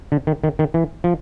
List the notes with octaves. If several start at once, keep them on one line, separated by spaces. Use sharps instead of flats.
D3
D#3
D#3
D#3
E3
F3